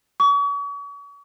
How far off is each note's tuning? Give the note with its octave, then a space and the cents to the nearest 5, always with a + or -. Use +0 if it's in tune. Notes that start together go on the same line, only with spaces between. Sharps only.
C#6 +40